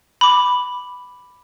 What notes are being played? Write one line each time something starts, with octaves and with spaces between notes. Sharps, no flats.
B5 D6